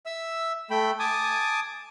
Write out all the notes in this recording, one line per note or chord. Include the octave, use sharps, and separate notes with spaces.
E5 E6
A3 G5 B5
G#5 A5 D6 D#6